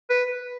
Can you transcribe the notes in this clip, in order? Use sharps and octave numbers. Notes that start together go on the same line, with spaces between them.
B4